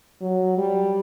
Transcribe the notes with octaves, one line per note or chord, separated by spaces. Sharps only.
F#3
G3